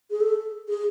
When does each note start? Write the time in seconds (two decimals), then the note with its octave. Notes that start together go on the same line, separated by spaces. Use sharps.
0.11 G#4
0.21 A4
0.69 G#4